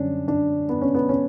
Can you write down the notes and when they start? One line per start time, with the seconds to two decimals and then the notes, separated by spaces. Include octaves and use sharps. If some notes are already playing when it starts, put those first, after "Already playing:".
Already playing: F#2 D3 G3 C#4 D4
0.28 D4
0.69 B3
0.81 C#4
0.95 B3
1.09 C#4